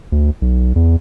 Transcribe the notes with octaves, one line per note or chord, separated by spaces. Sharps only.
D2
B1
E2